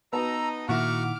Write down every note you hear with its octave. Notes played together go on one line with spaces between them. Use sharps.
B3 D#4 F#4 D#5 A5 A#5 E6
A#2 D#3 E4 F#4 F#5 C#6 D6 F6